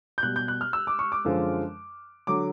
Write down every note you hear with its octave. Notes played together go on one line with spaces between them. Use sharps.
G6
B2 G3 F#6
G6
F#6
F6
E6
D6
C#6
D6
F#2 D3 F3 G#3
D3 F#3 D6